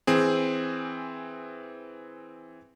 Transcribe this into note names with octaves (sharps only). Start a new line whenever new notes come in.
E3 C4 G#4